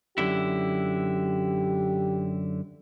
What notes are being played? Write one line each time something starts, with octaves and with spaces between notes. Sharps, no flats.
F#2 D3 E4 G4